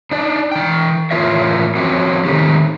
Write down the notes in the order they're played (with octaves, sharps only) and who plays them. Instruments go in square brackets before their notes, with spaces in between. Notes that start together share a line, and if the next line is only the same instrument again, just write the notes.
[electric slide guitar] D4 D#4 D5
E3 G5
A2 E3 F4 A#4 C#5 E5
F3 C4 C#4 F#4
D#3 A3 C4 D#4 G4